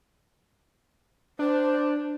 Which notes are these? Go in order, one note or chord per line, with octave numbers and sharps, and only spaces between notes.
D4 C5